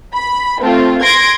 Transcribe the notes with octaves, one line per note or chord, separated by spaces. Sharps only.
B5
A3 C4 F4
C6 G#6 A#6 D7